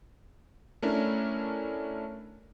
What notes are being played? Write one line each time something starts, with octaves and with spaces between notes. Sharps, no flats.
A3 C#4 D4 E4 A#4